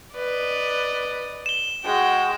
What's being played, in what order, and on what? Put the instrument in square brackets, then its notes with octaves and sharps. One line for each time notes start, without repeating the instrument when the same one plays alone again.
[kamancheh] B4 [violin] D5 D#5
[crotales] E7 G7
[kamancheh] G#3 [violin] F#4 G5